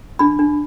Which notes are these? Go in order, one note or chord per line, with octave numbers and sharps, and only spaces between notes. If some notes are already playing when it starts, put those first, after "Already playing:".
D4 B5
D4